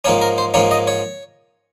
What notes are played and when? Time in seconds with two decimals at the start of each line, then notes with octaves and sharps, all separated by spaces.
0.05 G#2 F3 A#3 C#4 C#5
0.22 A#4
0.38 C5
0.54 G#2 F3 A#3 C#4 C#5
0.71 D#5
0.87 C#5